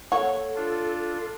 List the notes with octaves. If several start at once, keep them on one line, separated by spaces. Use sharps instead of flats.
A#3 A4 C#5 F#5
D4 F4